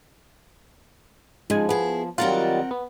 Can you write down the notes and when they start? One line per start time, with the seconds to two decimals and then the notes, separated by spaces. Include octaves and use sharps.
1.50 G#2 C#3 F3 G#3 G#5
1.69 B3 E4 G#4
2.18 D#3 F#3 G3 C4 F4 A#4 F#5 A6
2.71 B3